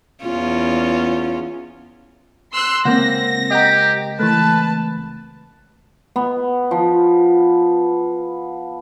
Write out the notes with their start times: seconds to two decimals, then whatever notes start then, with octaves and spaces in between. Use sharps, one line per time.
0.22 E2 C#4 F4
2.52 C6 E6 F#6
2.85 C#2 A#3 C4 F#5 G6 A#6
3.51 G4 D#5 F#5 A#5
4.19 E3 A3 B4 A5
6.16 B3
6.71 F3